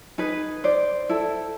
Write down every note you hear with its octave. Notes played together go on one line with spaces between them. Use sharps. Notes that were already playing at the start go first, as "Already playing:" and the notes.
D#4 G#4 B4
C5 D5
E4 A4